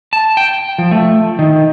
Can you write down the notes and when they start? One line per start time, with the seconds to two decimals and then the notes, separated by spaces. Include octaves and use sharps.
0.13 A5
0.37 G5
0.78 F3
0.91 A3
1.39 D#3